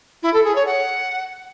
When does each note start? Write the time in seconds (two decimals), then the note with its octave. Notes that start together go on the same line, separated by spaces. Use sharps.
0.22 E4
0.33 A4
0.44 G#4
0.55 C#5
0.66 F#5